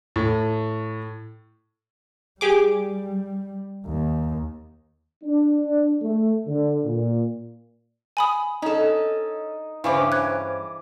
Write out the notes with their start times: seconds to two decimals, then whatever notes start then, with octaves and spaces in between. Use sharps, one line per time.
0.16 A2
2.41 G3 G4 G#4 D6
3.87 D#2
5.24 D4
6.02 A3
6.47 D3
6.85 A#2
8.17 G#5 B5 D#6
8.62 C#4 D#4 A4
9.84 G2 C#3 E3 C#4 C5 F5 D6
10.12 F#6 G#6